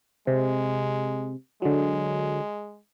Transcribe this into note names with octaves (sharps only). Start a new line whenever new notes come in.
C3 G#3
D3 F#3 G#3